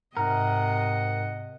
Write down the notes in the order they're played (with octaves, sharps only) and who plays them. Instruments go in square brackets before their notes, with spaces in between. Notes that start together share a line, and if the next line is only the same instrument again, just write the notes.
[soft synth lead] G#2 [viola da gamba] C3 D#5 [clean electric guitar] A#4 [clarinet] F#5